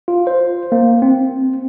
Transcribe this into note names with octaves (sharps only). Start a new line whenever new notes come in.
F4
C5
A#3
C4